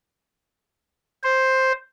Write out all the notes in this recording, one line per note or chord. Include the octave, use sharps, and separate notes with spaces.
C5